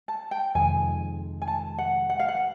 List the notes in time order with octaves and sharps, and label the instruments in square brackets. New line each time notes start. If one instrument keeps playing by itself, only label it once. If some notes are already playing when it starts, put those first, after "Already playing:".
[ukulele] A5
G5
[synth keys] F2 C3 D#3 G#3 [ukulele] G#5
[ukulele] G#5
A5
F#5
F#5
F5
F#5